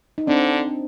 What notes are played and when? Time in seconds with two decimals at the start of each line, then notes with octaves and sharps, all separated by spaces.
0.18 D#4
0.27 D3 C4 D4